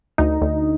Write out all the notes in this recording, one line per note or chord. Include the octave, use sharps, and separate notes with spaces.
D2 D#4
D2